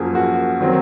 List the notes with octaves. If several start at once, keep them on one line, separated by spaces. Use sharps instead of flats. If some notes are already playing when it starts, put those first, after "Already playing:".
Already playing: F#2 F3 A#3 G#4
F#4
D#3 F#3 C4